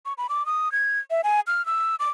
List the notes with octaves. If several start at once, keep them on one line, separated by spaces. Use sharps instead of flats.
C#6
B5
D6
D#6
G#6
E5
G#5
F6
E6
D6